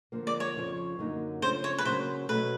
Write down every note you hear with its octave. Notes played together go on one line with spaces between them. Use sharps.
D3 F3 A#3
D5
C#5
F2 C#3 F3
F#2 D3 F#3 A#3 D#4
C#3 F3 A3 D4 C5
C#5
B4
C#3 F#3 A#3 C5
B2 F#3 A3 B4